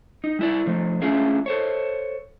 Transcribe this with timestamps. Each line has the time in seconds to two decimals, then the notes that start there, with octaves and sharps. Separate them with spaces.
0.24 D#4
0.39 G3 E4 D5
0.66 D3 F3 A3
1.01 A3 C#4 D4 F4 G#4 E5
1.46 A4 C5 C#5